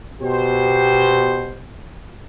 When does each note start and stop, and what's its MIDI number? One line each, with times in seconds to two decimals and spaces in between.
0.21 1.64 47
0.21 1.64 67
0.21 1.64 72